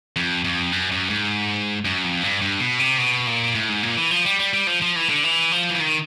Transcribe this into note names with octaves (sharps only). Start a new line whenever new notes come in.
F2
F2
F#2
F#2
G#2
F#2
F2
G2
G2
B2
C3
B2
A#2
A2
G#2
A#2
E3
F3
G3
G3
G3
F3
F3
E3
D3
E3
F3
E3
D#3